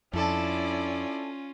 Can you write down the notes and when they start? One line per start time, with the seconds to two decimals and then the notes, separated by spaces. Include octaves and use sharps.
0.13 F2 C#4 D4 E4 F4 A4 D5